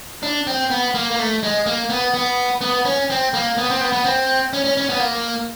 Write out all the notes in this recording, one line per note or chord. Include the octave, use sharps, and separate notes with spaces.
D4
C4
B3
A#3
A#3
A3
G#3
A#3
B3
B3
B3
C#4
C4
A#3
B3
C4
B3
B3
C4
C#4
C#4
C#4
B3
A#3